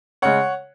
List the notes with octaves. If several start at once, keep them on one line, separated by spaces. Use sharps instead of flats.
C#3 G#3 C#5 F#5